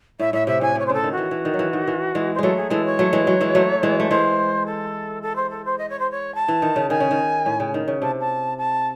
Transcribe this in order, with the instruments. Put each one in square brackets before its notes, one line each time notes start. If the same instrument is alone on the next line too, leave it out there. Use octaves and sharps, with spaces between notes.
[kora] A2 [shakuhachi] E5
[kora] A2 [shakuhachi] E5
[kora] C3 [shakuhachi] E5
[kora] A2 [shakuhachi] G#5
[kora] C3 [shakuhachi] C#5
[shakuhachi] C5
[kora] C#3 [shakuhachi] A4
[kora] D#3
[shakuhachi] F#4
[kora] E3
E3
D#3
F#3
E3
D#3
E3
E3 G#3
[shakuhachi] C5
[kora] F#3 G#3 A3 [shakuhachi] A4
[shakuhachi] G#4
[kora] E3 G#3 [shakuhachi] A4
[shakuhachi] C#5
[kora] F#3 A3
E3 G#3
F#3
E3 G#3
F#3 A3
E3 G#3
A3
[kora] E3 G#3 [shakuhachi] C5
[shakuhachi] A4
A4
C5
A4
C5
D#5
C#5
C5
C#5
A5
[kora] E3
D#3
C#3
[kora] D#3 [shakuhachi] G#5
[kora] C#3
D#3
A2
C#3
D#3
C#3
[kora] C3 [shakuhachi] A5
[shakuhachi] A5
A5